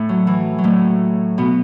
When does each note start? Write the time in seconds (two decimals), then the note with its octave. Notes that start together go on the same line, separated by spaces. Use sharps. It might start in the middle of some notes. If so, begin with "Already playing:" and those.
Already playing: A2 A3
0.09 F#3
0.27 E3
0.58 F#3
0.64 A2 A3
1.38 B2 B3